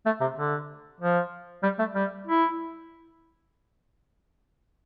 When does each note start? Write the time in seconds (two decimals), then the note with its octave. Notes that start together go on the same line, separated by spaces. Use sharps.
0.06 A3
0.21 C3
0.37 D3
1.00 F3
1.63 G3
1.79 A3
1.95 G3
2.27 E4